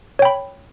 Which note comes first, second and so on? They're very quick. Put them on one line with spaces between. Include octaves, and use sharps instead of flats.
C#5 G5 B5